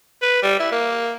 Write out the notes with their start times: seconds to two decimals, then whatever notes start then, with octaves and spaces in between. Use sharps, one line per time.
0.22 B4
0.43 G3
0.59 E4
0.72 A#3